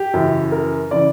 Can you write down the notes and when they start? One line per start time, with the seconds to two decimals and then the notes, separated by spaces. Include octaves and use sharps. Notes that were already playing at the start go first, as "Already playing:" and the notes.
Already playing: G4
0.14 F#2 C#3 E3
0.52 A#4
0.91 C#3 E3 D5